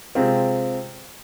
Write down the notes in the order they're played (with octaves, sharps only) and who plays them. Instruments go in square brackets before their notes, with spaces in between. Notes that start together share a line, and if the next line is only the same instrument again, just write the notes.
[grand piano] C3 G#3 C4 F4